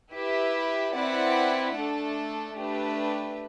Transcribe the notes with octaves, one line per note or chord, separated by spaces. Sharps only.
E4 G4 B4 E5
C4 E4 B4 D5 F#5
A3 D4 A4
A3 D4 G4 B4 E5